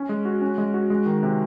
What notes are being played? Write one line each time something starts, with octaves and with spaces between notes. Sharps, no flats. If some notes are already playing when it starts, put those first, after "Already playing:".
Already playing: C#4
G#3
F#4
C#4
G#3
F#4
G#3
D#3
C3